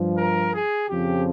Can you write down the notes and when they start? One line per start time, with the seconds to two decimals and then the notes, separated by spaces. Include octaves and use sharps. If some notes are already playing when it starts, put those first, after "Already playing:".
Already playing: G2 F3
0.18 A#4
0.54 G#4
0.90 F2 C#3 F3 G4